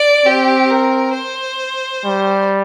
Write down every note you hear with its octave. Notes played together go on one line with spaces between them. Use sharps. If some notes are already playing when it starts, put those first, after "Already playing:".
Already playing: D5
C4 G4
A#4
C5
G3